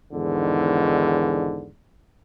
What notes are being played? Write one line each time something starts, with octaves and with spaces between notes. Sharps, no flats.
E2 G#2 D3 D#3